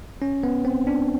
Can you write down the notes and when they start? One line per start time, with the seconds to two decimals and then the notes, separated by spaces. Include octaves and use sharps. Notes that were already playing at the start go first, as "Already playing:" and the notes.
0.22 C#4
0.43 B3
0.65 C4
0.87 D4